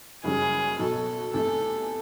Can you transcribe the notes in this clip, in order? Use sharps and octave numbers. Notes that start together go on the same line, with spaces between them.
F#1 F#2 C#3 E3 G3 G#4
B1 B2 F#3 A4
E2 C3 E3 A3 A4